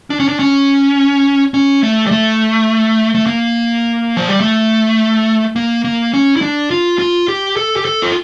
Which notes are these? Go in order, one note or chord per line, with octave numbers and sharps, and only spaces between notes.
D4
C#4
D4
C#4
C#4
A3
G3
A3
A3
A#3
F3
G3
A3
A#3
A#3
C#4
E4
D4
F4
F4
G4
A4
G4
A4
F4